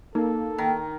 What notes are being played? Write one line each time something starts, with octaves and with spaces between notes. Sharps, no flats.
A#3 D#4 A4
D#3